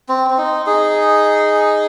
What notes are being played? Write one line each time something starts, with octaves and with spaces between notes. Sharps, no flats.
C4
C4
D#4
D#4 G#4